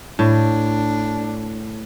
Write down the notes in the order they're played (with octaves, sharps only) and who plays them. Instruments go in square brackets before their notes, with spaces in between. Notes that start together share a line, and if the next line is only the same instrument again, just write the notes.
[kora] A2 [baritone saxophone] D4